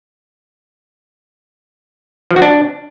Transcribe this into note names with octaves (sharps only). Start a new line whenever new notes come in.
F3
F#4
D4